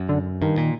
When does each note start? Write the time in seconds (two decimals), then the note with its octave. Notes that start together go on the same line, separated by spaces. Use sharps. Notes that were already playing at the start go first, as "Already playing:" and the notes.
Already playing: F#2
0.09 D3
0.42 G2 D#3
0.58 A#2